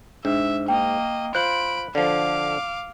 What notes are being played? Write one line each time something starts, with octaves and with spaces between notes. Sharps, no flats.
G#2 D4 E5
A#3 D#5 G5
F4 C5 B5 F#6 D7 F#7
D3 F3 F5 D6